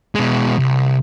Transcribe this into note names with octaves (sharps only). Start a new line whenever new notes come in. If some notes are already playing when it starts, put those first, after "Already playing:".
B2 G#3
C2